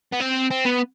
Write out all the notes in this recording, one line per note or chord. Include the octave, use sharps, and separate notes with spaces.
B3
C4
C4
B3